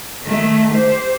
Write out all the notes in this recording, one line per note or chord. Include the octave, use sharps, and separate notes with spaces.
D#3 A3
G4 C5